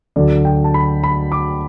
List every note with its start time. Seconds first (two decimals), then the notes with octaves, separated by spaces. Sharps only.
0.16 D2 D3 F#3 D5
0.45 G5
0.64 A5
0.74 B5
1.04 B5
1.32 D6